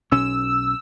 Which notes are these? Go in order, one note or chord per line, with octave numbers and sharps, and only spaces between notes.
B1 C#4 E6